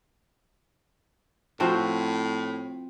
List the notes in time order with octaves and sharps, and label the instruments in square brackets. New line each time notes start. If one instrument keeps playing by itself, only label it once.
[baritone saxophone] A2 [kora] F3 C4 F#4